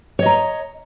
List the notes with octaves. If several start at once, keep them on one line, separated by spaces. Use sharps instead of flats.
C#5 D#5 A#5